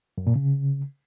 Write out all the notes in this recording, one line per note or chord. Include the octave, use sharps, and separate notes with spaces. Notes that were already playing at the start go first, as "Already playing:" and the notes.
F#2
A#2
C#3